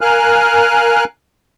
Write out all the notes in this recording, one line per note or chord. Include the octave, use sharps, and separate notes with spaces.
A#4 F5 G#5 F6 F#6